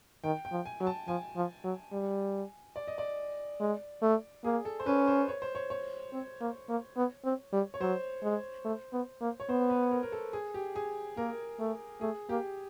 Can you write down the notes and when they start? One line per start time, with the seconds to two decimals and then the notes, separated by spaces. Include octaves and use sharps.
0.24 D#3 G5
0.45 G5
0.52 F3
0.66 G#5
0.80 F#3
0.87 A5
1.08 F3 G#5
1.36 F3
1.64 F#3
1.92 G3
2.76 D5
2.87 D#5
2.98 D5
3.60 G#3
4.02 A3
4.44 A#3 G#4
4.65 A4
4.80 C5
4.86 C#4 B4
5.07 C5
5.28 C#5
5.42 C5
5.55 C#5
5.70 C#5
6.12 C4
6.41 A#3
6.69 A#3
6.97 B3
7.25 C4
7.53 G3
7.74 C#5
7.81 F#3 C5
8.23 G#3
8.65 A3
8.93 B3
9.21 A#3
9.40 C#5
9.49 B3 C5
9.70 B4
9.91 A#4
10.03 A#4
10.12 A4
10.33 G#4
10.54 G4
10.76 G#4
11.17 A#3 A#4
11.59 A3
12.01 A3 G#4
12.29 A#3 G4